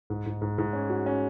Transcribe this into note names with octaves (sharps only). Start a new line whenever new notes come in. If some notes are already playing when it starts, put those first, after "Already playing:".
G#2
G#2
G#2
G#2
C#4
F#4
C#4